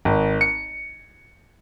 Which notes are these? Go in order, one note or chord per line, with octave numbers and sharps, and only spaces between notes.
G#1
C#7